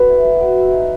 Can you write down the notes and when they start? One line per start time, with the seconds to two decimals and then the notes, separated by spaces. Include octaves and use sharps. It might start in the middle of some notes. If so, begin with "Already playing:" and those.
Already playing: B3 F#4 A4 B4 C5
0.09 E4
0.25 F#3
0.40 F#3
0.57 E4
0.73 D#4